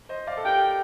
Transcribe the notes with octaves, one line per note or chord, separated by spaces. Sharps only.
C5 D#5
D5 F5
A4
G4 A#4 G5